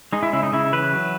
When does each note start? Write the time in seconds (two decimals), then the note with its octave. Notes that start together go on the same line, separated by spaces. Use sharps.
0.12 G#3 D#4
0.23 E4
0.33 C#3 E4
0.43 D#4
0.53 C#3 E4
0.73 E3 B4
0.93 F#3